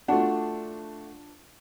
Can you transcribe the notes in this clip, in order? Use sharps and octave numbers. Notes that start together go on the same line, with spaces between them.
A3 D4 F4 F#4 F#5